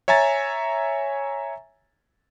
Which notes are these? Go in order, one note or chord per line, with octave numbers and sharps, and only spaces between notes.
C#5 E5 G#5 A#5 A6